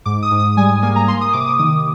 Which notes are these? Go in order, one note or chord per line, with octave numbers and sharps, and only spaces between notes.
G#2 D6
D#6
G#2
D#6
G3 G#5
A#3 G#5
A#5
A#3 C6
D#6
C3 D6
D#6
D#3 D#6